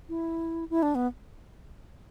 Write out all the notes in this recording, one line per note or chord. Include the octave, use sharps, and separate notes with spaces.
E4
E4
D4
B3